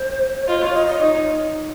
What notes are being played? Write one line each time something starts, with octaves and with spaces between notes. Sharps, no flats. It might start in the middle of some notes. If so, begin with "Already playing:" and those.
Already playing: C5
C#5
F4 D#5
C#5
D#5
D#5
D#4 C#5